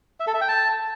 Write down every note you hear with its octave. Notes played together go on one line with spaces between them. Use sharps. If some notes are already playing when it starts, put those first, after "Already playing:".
E5
A4
E5
G5
A5